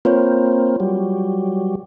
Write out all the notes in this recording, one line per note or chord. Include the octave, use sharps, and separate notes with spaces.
A#3 C4 F4 B4 C#5
F#3 G3